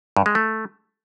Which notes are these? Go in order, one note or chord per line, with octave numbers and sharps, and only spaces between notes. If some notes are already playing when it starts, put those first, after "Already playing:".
G2
G#3
A3